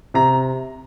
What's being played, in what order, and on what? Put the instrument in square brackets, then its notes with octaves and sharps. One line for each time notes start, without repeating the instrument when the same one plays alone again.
[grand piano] C3 A#5